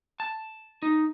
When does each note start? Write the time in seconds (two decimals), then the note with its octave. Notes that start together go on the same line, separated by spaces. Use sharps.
0.20 A5
0.82 D#4